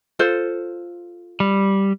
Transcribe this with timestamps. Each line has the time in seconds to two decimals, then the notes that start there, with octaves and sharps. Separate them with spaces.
0.19 F4 A4 C5
1.40 G3